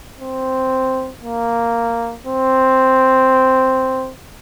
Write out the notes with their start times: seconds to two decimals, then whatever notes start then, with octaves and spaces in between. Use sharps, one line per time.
0.19 C4
1.23 A#3
2.26 C4